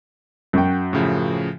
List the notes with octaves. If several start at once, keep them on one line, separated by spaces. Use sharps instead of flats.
F#2 F#4 G5
A2 C#3 F3